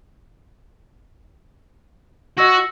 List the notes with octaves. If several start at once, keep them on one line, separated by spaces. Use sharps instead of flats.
F#4 D#5 E6 A#6